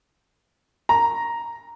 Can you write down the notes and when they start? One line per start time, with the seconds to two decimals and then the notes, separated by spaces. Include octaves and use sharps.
0.89 A#5